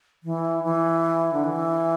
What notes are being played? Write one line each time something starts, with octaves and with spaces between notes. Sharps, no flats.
E3
E3
D3
E3